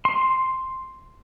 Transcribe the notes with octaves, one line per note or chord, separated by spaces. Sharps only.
C6